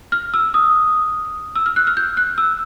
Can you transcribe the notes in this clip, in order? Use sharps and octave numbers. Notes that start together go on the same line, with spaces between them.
F6
E6
D#6
E6
F6
F#6
F6
G6
F#6
E6